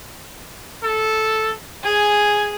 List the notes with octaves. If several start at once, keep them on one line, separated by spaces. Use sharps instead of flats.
A4
G#4 G#5